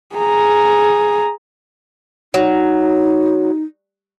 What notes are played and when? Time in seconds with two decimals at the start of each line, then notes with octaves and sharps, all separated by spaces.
0.16 G#4 A#5
2.34 F#3 D#4